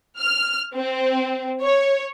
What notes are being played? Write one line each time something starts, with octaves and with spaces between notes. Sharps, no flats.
F6
C4
C#5